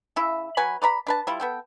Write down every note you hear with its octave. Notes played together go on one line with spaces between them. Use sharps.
C#3 E4 E5
F#3 B4 G#5 B5
B4 D5 A#5 B5
D4 B4 A5
G3 E4 F4
B3 A4 G5